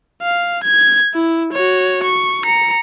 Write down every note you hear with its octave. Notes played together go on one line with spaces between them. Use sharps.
F5
G#6
E4
F#4 C#5
C#6
A#5 C#7